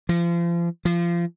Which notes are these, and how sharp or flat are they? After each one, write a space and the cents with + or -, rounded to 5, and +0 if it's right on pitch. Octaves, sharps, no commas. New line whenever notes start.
F3 -35
F3 -25